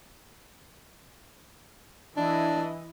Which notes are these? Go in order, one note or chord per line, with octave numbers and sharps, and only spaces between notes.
E3 D4 E4 D#5